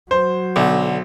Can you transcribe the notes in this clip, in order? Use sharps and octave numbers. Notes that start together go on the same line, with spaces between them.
F#3 C5
B1 D3